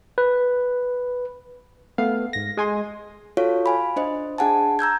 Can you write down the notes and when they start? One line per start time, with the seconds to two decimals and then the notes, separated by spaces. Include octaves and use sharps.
0.18 B4
1.98 A3 B3 F5
2.33 G#2 A#6
2.57 G#3 G#5 C6
3.37 F4 F#4 A4 C#5 F5
3.66 F5 G#5 B5
3.96 D4 C5 D#5
4.38 D4 G#4 F#5 G#5 A5
4.79 A#5 E6 G6 G#6